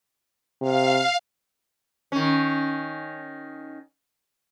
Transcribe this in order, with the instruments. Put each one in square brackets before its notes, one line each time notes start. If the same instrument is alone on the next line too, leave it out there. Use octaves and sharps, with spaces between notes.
[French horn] C3 [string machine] F5
[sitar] D#3 C#4